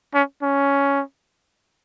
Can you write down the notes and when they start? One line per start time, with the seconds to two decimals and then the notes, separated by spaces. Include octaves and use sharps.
0.14 C#4
0.42 C#4